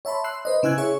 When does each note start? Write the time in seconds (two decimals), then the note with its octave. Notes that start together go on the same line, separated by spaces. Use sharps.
0.05 C#5 E5 A5 B5 C6
0.24 C6 E6 F#6 C7
0.45 B4 C5 D#5
0.63 C#3 E4 G#5 E6 F#6 G#6
0.78 G#4 C#5 E5 C#6